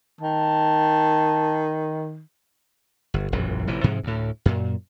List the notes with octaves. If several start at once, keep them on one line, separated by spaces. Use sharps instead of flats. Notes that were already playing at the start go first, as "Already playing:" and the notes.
D#3 A5
G1
E1 A#1 F#2 F#3
A1 C3 E3 F3
G#2 C3 F3 G#3
D2 A2
F#2 A#2